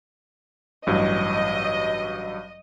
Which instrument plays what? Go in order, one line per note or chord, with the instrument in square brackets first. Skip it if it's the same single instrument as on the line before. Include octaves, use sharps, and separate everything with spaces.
[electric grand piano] A1 G2 F#3 [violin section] D#5